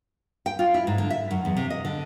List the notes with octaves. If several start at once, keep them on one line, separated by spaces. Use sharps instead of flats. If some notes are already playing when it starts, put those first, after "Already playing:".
G5
F4
E4
G#2
D3
E5
F#2
E2
C3
D#5
D3